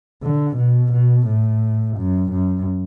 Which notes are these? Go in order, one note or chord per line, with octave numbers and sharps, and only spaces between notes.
D3
B2
B2
A2
F#2
F#2